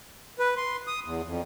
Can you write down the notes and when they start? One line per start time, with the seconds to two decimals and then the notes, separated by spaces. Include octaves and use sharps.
0.39 B4
0.57 C6
0.87 D#6
1.05 E2
1.26 F2